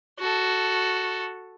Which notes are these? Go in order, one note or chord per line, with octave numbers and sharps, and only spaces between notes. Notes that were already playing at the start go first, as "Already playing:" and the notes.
F#4 A4